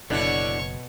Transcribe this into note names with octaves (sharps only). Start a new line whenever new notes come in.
F#1 B2 D3 D4 E4 C#5 C#6